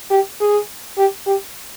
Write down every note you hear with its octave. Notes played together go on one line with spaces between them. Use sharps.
G4
G#4
G4
G4